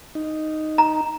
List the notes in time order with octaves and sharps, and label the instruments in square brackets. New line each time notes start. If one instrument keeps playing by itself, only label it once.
[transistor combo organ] D#4
[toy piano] A#5